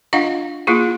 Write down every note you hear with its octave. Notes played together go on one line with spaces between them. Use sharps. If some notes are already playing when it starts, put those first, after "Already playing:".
D4 F4 D#5 F5 F#5
A#3 E4 F4 G#4